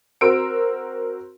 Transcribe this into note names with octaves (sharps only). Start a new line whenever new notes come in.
C4 F#4 A#4 C6 E6 D7